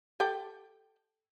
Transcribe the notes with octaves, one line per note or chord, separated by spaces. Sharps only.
G4 A4 G5